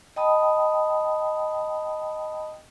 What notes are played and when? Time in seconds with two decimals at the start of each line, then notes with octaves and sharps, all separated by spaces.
0.16 D#5 G5 A5 B5 D#6